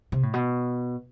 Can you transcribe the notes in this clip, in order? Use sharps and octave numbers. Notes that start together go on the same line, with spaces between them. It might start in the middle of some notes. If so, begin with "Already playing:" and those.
C3
A2
B2